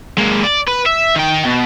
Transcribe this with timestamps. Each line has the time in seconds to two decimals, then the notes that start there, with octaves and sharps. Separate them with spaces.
0.18 G#3 A#3
0.43 D5
0.67 B4
0.86 E5
1.16 D#3 G5
1.45 B2